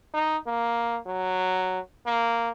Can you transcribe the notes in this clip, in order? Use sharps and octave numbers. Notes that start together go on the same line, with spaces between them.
D#4
A#3
F#3
A#3